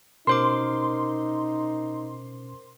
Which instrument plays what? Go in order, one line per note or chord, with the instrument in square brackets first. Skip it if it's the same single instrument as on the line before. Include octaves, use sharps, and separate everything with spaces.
[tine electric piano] B2 C#4 [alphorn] D#4 [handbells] A#4 C5 D6 [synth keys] C6